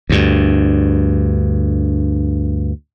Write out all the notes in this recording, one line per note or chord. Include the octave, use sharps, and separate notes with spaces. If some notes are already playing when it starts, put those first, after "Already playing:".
D2 G2